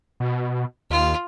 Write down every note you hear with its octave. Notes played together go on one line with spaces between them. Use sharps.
B2
D#2 F4